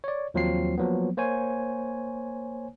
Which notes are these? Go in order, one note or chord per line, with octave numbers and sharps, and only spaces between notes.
C#5 D5
D#2 F3 F#3 C4 F4 C7
F3 F#3 A#3 B3
A#3 C5 C#5 G#5